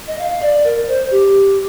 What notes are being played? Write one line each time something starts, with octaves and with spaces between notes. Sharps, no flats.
D#5
F5
D5
A#4
C5
G4